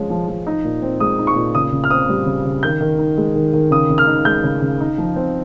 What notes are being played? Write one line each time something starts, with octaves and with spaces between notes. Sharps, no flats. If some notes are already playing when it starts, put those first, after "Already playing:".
Already playing: F3 G#3 C#4
F3
F3
D#4
A#2
C4
G#3 D#6
D#4
C#6
A#2
C#3 D#6
C#3
F6
C4 D#6
G3
C#3
C#3
D#3 G6
D#3
D#4
G#3
D#3
D#3
C#3 D#6
C#3
F6
D#4
G#3 G6
C#3
C#3
D#4
F3
C4